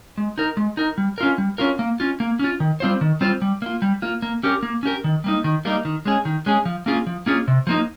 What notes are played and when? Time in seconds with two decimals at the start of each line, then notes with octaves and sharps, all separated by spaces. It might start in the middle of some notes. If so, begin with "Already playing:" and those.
0.18 G#3
0.38 D#4 A#4
0.57 G#3
0.77 D#4 A#4
0.98 G3
1.18 C#4 F4 A#4
1.38 G3
1.58 C#4 F4 A#4
1.79 A#3
2.00 C#4 F4
2.20 A#3
2.39 C#4 F4
2.60 D#3
2.80 G3 C4 F4 C5
3.01 D#3
3.21 G3 C4 F4 C5
3.42 G3
3.62 A#3 F4
3.82 G3
4.02 A#3 F4
4.22 A#3
4.43 C#4 G4 A#4
4.63 A#3
4.83 C#4 G4 A#4
5.04 D#3
5.24 G3 A#3 D#4
5.44 D#3
5.65 G3 A#3 D#4
5.85 D#3
6.05 G#3 C#4 G#4
6.25 D#3
6.46 G#3 C#4 G#4
6.65 F3
6.86 A#3 C#4 F4 G#4
7.07 F3
7.26 A#3 C#4 F4 G#4
7.48 C3
7.67 F3 A#3 D#4